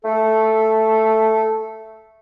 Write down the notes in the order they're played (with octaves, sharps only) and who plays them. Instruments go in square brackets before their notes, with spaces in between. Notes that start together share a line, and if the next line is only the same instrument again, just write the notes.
[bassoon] A3 [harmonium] A4